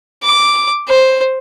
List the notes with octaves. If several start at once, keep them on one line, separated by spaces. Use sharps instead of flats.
D6
C5